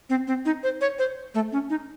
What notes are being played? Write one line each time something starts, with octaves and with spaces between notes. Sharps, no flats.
C4
C4
D#4
C5
C#5
C5
A3
C#4
D#4